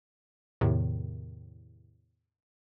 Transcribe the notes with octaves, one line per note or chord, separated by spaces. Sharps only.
E2 A2 C3 D#3